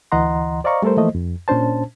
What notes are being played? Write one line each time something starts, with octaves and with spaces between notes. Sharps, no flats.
D2 E3 D#5 F#5 A#5 C6
C5 D5 D#5 F5 A#5 C#6
G3 A3 A4 A#4 C5
E3 F3 A3 A#3 C5 D#5
F2
A#2 C#4 D4 C5 A5